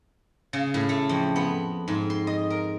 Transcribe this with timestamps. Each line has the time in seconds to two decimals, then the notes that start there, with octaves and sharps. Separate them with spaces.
0.53 C#3
0.74 A2
0.89 A3
1.09 F2
1.36 B3
1.88 G#2
2.10 C6
2.27 D#5
2.50 A#4